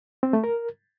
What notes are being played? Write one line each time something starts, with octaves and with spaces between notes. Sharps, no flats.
C4
A3
A#4